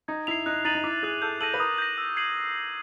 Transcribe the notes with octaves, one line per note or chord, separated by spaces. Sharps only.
D#4 G#6
E4 C7 F7
D#4 F#6
D#4 A6 C7 D#7 F#7
D#4
E4 D6
G#4 F#6 A6
A4 G6
A4 A#6 D#7 F#7
B4
A#4 D#6
G6 A#6
E6
G#6 C7 D#7 F#7